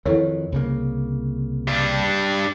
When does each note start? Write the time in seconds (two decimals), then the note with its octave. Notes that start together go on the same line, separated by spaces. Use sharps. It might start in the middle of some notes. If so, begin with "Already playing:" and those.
0.06 F2 D#3 E3 E4 A4 C#5
0.52 C2 C#3 A#3
1.68 G2 D4